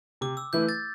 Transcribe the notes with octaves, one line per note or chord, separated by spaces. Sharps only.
C3 D6
E6
E3 A3 E4 B4 G6
A6